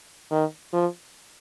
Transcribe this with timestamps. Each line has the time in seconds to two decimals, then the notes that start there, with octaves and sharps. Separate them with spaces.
0.31 D#3
0.73 F3